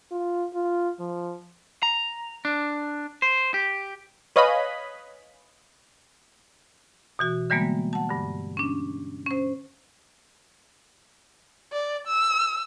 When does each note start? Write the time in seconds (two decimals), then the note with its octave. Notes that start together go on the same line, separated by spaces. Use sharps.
0.12 F4
0.54 F4
1.00 F3
1.83 A#5
2.45 D4
3.22 C5
3.54 G4
4.36 B4 C#5 D#5 F5 G#5 B5
7.19 B2 E3 F#4
7.50 D3 E3 G3 G#3 A#3 B3
7.93 F#5 A5
8.09 G2 D3
8.57 C#4 D4
9.26 C#4 C5
11.72 D5
12.07 E6